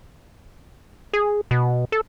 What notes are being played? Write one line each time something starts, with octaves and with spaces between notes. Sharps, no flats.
G#4
B2
A4